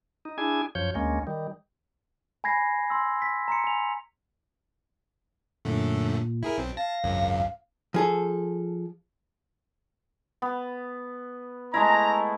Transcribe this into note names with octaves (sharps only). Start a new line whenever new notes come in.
D#4
D4 E4 G#4 G#5
F#2 F3 C#5 G6
D2 G#3 A#3 C#4
D#3 G3
G#5 B5 G#6 A#6 C7
C6 E6
B6
A#5 C6 C#7
G#5 F7
F#2 A#2 D3 A3
E4 G#4 A#4
B1 C4
F5 A5 A#6
G#1 C#2 F#2
F3 G#4 A4
B3
G#3 A3 E4 A#5